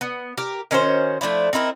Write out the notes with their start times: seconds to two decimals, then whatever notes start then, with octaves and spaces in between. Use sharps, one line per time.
0.01 B3
0.38 G4 A#4
0.71 D#3 C#4 F#4 C5
1.21 F3 A3 D4 E4
1.53 C4 D#4 E4 A#4